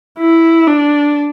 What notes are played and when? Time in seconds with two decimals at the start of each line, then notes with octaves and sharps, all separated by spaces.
0.19 E4
0.67 D4